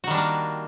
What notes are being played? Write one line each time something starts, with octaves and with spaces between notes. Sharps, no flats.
D#3 G3 A#3 D4 F#4